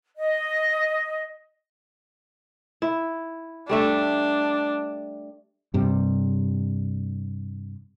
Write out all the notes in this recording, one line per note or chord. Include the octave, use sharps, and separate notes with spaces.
D#5
E4
G3 A3 D4 E5
G2 C3 G3